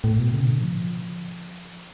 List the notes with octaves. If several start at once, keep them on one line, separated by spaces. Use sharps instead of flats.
A2
B2
C#3
D3
F3